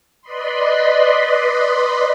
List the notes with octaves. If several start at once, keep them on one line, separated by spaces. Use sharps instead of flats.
B4 D5 D#5 B5 C6